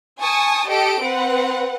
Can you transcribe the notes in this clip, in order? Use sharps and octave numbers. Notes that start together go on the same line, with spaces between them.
G#5 A5 C#6 D#6
G4 A4 D#5 D7
C4 B4 F#5